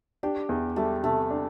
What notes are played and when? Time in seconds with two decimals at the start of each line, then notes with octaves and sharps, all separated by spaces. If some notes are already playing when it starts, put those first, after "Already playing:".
0.23 D4 G4
0.49 E2
0.76 G3 A3
1.04 C3 A3
1.31 D4